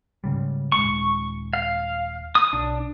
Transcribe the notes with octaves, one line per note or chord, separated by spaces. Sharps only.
G#2 C#3 G3
D#1 B1 G#3 C#6
F5
D#6
B1 D4